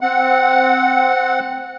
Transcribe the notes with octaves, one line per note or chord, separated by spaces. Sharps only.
C4 F#5